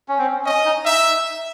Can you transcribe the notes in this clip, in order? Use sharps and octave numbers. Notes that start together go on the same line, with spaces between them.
C#4
C4
C#4 D#5
D#4
D#4 E5